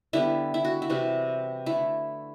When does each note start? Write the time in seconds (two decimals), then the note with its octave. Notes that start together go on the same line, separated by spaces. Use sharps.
0.13 D3 G3 B3 E4
0.54 E4
0.65 F#4
0.82 E4
0.90 C3 E3 G3 F#4
1.66 D3 A3 E4